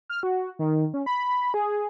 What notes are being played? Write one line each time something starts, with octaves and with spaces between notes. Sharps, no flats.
F6
F#4
D#3
C#4
B5
G#4